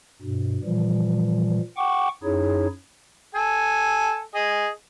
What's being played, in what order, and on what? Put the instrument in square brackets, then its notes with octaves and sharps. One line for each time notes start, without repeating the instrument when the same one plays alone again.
[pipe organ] G2 B2
A#2 E3 F3 G3
F#5 G5 C#6 D6
F#2 D#4 E4 G#4 C#5
[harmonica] A4 G#5
G#4 D#5